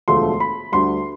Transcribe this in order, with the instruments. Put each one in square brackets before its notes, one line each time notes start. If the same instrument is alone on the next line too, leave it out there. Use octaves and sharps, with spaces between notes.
[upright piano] E1 D2 D3 F3 A3 C6
B5
D2 D3 G3 C6